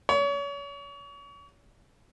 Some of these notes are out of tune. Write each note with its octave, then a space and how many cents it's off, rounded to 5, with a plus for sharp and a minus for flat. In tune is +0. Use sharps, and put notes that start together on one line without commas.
C#5 +35